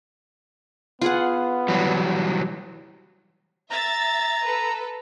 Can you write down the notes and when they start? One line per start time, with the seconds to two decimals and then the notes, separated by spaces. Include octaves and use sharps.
1.01 B3 F4 G#4 F#5
1.68 E3 F#3 G3
3.71 E5 A#5 A6
4.45 A4 B4